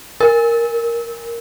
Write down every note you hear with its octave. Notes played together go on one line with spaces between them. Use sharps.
A#4